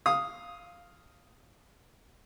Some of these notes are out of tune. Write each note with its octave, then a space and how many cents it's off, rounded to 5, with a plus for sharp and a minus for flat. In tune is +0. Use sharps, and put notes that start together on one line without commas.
F5 +0 D#6 +0